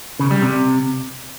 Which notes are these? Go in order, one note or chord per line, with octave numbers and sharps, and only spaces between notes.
C#3
G3
C3